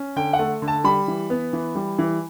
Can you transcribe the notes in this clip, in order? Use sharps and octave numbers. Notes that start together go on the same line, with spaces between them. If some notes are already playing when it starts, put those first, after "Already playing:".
Already playing: C#4
D3 G5
F#5
A3
D3
A5
G3 B5
E3
B3
E3
G3
E3